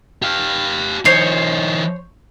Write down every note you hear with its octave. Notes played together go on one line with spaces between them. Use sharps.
G4 F5
E3 D#4 C5 C#5